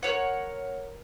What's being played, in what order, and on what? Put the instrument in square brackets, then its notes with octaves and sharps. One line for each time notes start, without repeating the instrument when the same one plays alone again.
[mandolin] A#4 B4 C#5 F#5